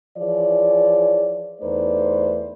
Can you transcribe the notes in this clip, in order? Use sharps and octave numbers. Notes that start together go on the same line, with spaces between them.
E3 F3 G#4 C#5 D5
E2 A3 D#4 B4 C5 D5